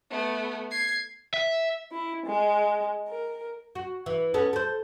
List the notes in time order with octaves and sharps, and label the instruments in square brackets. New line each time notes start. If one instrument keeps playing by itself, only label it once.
[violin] A3 B3
G#6 C7
[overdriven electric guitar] E5
[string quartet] E4
G#3
A#4
[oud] F#4
E3
B3 C#4 A4
A4 C5